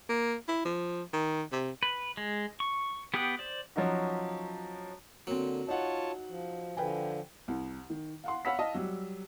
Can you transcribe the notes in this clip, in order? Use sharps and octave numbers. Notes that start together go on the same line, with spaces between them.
A#3
E4
F3
D#3
C3
B4
G#3
C#6
B3 G4 G5 D#6 F#6
C5 D5
F3 F#3 C#4 D#4 F#4
D3 F#3 A#3 C4
D#4 F4 C#5 F#5 A5
F3
D3 F3 B4 G5 G#5
C2
D#3
F5 F#5 C6
C#5 F5 F#5 B5 E6 B6
D#5 F5 A5
F#3 G3